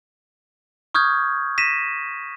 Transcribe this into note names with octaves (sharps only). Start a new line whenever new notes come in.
C#6 D#6 F6 G6 G#6
A#6 B6 D#7 E7